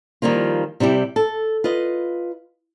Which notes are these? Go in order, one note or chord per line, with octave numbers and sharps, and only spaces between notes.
D#3 F3 G3 A#3 F4
C3 G3 E4 G4
A4
F4 B4 D#5